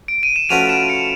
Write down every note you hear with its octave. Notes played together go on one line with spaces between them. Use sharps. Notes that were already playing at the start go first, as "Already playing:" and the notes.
D7
D#7
E7
F3 A3 C#4 F#4 B4 D#7 F7
D7 E7
C#7 D#7